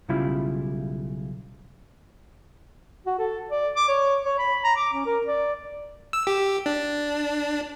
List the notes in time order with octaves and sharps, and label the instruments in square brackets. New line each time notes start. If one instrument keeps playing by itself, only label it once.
[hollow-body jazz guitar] B1 C#3 G3 E4 F4 B5
[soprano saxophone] F#4
A4
D5
D6
C#5
C#5
B5
A#5
D6
C#4
A#4
D5
[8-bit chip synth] E6
G4
D4